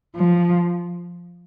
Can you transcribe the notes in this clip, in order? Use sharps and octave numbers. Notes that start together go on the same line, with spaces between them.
F3